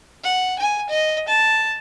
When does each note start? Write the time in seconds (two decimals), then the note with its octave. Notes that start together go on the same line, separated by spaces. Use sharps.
0.23 F#5
0.59 G#5
0.90 D#5
1.28 A5